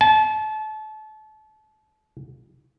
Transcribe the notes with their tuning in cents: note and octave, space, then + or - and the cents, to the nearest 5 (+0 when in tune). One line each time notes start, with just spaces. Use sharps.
A5 -30